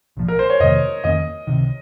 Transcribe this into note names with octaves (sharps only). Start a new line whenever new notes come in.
A#1 A#2 F3
A#4
C5
C#5
F2 C3 D#3 A3 D#5
F2 D#3 A#3 C#4 D#5
C#2 C3 D#3